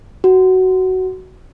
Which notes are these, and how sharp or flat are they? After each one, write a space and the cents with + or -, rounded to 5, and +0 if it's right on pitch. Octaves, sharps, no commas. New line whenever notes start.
F#4 +15